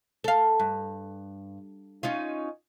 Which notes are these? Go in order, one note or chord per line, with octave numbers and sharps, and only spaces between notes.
A4 F5
G2
C#4 D#4 F4